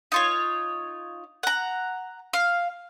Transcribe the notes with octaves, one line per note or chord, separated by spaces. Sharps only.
D#4 F4 C#5
F#5 A#5
F5